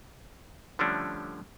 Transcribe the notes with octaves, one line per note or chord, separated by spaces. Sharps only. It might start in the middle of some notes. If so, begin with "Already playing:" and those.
D3 F3 G3 A3 C#4 D4